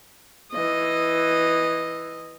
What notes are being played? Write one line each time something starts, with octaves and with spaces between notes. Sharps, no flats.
E3 D#5